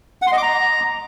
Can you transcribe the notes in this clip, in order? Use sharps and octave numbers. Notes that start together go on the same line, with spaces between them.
F#5
C6
D#5
D6
A#5